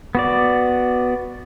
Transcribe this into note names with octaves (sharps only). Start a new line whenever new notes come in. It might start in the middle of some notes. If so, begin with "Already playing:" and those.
B3 F#4 D5